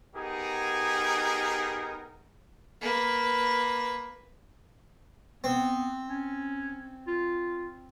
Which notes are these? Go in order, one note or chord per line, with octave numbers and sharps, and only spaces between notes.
B3 D#4 G4 G#4 A#4
A#3 B4
B3 C4
C#4
F4